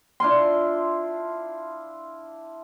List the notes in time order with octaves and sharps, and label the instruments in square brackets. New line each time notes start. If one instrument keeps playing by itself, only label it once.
[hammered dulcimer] D4 E4 F4 C6